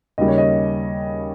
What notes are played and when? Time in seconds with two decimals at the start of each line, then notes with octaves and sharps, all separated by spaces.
0.18 D#2 C#3 G3 D#5
0.28 C#5
0.38 D#5